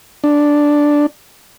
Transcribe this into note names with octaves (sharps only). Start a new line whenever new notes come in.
D4